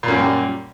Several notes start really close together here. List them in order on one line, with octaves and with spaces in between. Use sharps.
A#2 F#2 A#3 G3